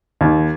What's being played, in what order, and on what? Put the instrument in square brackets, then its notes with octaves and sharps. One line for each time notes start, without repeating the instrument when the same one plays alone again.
[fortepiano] D#2